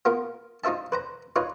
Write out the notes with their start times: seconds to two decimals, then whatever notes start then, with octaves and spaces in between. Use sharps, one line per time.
0.05 B3 F4 A#4
0.64 D#4 F4 C5 E5 A5
0.92 B4 C5 A#5
1.36 D#4 F4 B4 C#5